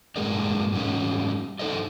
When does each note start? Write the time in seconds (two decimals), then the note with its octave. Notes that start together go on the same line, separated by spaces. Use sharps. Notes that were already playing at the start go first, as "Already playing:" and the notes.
0.16 G2 A#2 G#3 G#4 A#4 D5
0.72 G#2 G3 C#4 D#4
1.59 D#4 E4 A4 C5 D5 D#5